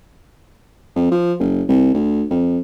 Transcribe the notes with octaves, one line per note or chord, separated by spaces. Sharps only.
F2
F3
F#1
C2
D2
F2